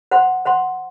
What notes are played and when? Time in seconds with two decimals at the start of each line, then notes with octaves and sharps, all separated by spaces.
0.11 C5 F#5 C6
0.45 C5 F#5 C6